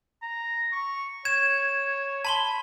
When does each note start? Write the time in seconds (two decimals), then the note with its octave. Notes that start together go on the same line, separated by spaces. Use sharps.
0.22 A#5
0.72 C#6
1.25 C#5 G#6 E7
2.25 A5 B5 C6 G7